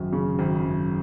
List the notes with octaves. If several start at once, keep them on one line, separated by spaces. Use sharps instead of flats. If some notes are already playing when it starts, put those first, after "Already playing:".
Already playing: G#1 F#2
C#3
G#1
F#2